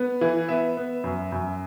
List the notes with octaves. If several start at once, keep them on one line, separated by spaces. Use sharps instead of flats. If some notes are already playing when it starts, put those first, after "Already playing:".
Already playing: B3
E3
B3 E5
B3
F#2
F#2